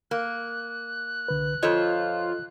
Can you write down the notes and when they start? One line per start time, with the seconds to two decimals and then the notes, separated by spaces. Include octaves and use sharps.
0.11 A#3 F#6
1.28 C2 D3 B4
1.63 F2 F4 A4 C5 C#5 D#5